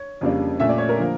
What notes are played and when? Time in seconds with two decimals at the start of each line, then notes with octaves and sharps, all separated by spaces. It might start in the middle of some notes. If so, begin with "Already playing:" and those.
Already playing: C#5
0.21 F2 C#3 G3 A#3 D4
0.60 A#2 A3 C#4 E5
0.69 D5
0.78 C#5
0.89 A#4
0.98 D3 F3 A#3